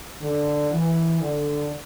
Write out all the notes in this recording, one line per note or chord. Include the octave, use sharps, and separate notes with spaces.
D3
E3
D3